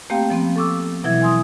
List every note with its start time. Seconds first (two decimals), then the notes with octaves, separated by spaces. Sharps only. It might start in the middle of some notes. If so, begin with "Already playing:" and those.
0.10 A3 A#3 C4 G4 F5 G5
0.30 F3 B3 C4
0.56 A4 C#6 D6 E6
1.04 B2 E3 F#3 E4 E5 G#6
1.22 G#5 C6 D#6